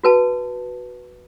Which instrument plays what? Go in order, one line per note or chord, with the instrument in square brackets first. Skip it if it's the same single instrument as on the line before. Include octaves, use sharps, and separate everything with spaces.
[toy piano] F#4 B4 A5